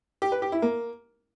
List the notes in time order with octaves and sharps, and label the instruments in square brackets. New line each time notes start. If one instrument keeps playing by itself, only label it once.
[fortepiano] G4
B4
G4
E4
A#3